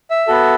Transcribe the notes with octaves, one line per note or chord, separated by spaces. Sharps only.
E5
B3 F#4 A4